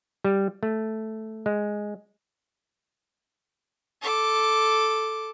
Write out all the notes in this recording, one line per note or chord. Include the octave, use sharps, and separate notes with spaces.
G3
A3
G#3
A4 D6